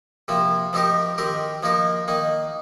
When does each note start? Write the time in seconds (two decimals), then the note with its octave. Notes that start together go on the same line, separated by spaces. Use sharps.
0.28 C3 F3 A#3
0.73 F3 C4 D#4 G4 A#4
1.18 D#3 C4 G4 A#4
1.63 F3 A#3 D#4 A#4
2.08 D#3 A#3 D#4